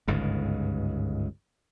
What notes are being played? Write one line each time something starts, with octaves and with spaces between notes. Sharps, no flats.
G1 C#2 G#2